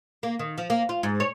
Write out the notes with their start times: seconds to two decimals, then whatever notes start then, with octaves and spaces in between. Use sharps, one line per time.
0.23 A#3
0.39 D#3
0.58 F3
0.70 A#3
0.89 F4
1.03 G#2
1.20 C#5